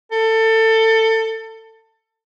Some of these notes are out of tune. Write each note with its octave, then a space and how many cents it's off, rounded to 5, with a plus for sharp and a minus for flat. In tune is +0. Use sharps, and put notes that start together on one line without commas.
A4 +25